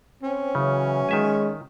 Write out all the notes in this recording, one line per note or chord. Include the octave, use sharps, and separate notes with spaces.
C4 C#4
C#3 E3 F#3
D#3 G#3 E5 G#5